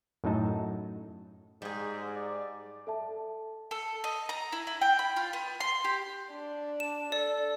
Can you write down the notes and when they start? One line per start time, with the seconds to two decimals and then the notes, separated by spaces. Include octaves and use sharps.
0.24 F#2 A2 F#3 D#4 A5
1.62 G#2 G3 G#4
2.16 D5
2.87 A4 E5 A5
3.71 A4
4.04 D#5
4.29 A#5
4.52 E4
4.67 E4
4.81 G5
4.99 B5
5.16 F4
5.33 B3
5.60 C6
5.84 G4
6.32 D4
6.80 E7
7.12 A4 D5